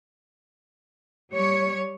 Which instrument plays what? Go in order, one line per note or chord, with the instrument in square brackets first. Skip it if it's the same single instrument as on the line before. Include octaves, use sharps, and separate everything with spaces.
[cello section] G3 C#5